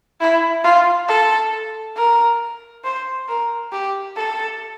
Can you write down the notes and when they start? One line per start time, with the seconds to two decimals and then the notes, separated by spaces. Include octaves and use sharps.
0.21 E4
0.64 F4
1.08 A4
1.96 A#4
2.84 C5
3.28 A#4
3.72 G4
4.16 A4